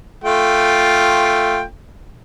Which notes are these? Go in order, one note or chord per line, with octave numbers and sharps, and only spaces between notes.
A3 F4 G5